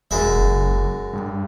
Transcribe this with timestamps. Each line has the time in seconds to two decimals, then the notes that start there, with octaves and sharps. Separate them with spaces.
0.11 E1 F#2 G#3 E5
0.36 F#1
1.14 G2